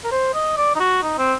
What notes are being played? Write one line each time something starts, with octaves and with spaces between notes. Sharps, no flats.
A#4
C5
D#5
D5
D#4
F#4
D#4
C4